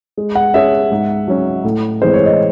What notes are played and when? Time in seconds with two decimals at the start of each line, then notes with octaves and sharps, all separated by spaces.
0.17 G#3
0.35 F#5
0.54 C#4 G#4 C#5 E5
0.92 G#2
1.28 F#3 C#4
1.64 A2
2.01 E3 G#3 C4 C5
2.14 C#5
2.26 D#5